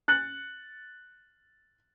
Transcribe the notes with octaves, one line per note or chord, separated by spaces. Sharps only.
F#6 A6 C#7 F#7